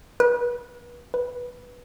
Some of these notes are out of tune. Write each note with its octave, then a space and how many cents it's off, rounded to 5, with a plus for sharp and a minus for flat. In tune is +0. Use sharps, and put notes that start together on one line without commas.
B4 -35
B4 -10